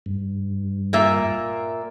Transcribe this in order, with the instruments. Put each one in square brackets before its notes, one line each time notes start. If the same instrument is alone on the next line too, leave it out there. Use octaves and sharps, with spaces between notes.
[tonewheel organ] G2
[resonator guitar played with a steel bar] A#2 A#3 E5